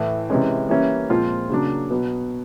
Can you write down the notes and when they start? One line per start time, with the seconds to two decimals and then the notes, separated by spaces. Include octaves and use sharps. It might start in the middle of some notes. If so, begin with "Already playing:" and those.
Already playing: A2 E3 A3
0.30 C3 E3 G#3 C#4
0.69 E3 G3 A#3 C#4 E4
1.10 A#2 F3 G#3 C4 F4
1.50 C#3 F#3 A#3 D4
1.91 B2 F#3 B3